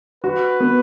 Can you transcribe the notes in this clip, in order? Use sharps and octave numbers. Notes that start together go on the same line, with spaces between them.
F#4 B4
B3